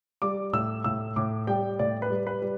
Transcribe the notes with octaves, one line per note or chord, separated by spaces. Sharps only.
G3 D6
A2 E6
A2 E6
A2 D6
G3 G5
A2 D5
B4
G3
B4
G3